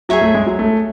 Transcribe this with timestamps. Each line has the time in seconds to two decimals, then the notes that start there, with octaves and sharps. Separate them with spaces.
0.09 F#3 G#4 C#5 E5
0.21 A3
0.35 G#3
0.47 F#3
0.59 A3